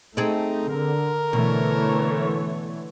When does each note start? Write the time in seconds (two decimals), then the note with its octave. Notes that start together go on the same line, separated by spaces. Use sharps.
0.17 A3 C4 D#4 G#4 A4
0.69 D3 A#4
1.33 B2 D3 E3 A3 C#5